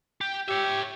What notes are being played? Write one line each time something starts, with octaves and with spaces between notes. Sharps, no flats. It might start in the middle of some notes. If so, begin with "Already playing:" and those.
G4
G4 C#5 E5